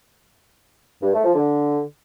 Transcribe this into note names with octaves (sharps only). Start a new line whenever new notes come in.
G2
A3
F3
D3